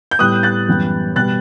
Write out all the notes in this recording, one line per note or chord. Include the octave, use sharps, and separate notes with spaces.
G6
A2 G3 B3 D#6 F#6
F#6 A6
F#2 E3 G3 B3
B2 G3 B3 F#6 A6